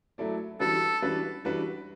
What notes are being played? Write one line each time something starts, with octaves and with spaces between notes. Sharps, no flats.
F#3 A3 E4 A4 D5
E3 G3 D4 F#4 A4 B4
E3 G3 D4 F#4 B4
E3 G3 D4 F#4 B4